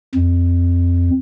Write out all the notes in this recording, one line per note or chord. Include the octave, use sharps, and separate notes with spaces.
F2